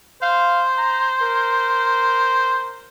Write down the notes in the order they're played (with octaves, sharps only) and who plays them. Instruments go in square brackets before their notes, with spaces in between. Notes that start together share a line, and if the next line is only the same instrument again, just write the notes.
[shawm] C5 [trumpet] F5
[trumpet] A#5
A#4